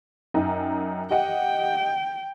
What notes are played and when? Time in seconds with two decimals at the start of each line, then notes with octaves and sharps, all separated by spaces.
0.34 F#2 D#4 G5
1.10 G4 D#5 F#5 G5